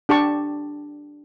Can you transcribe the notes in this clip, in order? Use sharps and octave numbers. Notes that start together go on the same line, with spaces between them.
D4 G4 A5 C#6